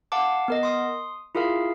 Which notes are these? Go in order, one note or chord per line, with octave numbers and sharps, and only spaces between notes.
F5 F#5 A5 D6
B3 A#4 D#5
C6 D#6
E4 F4 G#4 A#4 F5